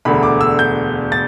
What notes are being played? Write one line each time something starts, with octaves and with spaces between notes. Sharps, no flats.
E1 D2 D3 B5
D6
E6
G6
A6